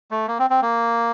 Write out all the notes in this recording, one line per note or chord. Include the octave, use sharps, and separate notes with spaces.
A3
A#3
C4
C4
A#3